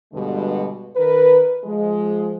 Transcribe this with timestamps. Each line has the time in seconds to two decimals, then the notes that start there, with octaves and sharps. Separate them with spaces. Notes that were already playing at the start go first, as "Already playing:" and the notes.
0.13 G2 B2 D3 G3 G#3
0.96 D#3 A#4 B4
1.64 F3 G#3